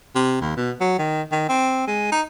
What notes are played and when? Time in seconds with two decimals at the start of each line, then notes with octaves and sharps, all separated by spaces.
0.15 C3
0.41 D#2
0.57 B2
0.80 F#3
0.99 D#3
1.32 D#3
1.49 C4
1.87 G#3
2.12 D#4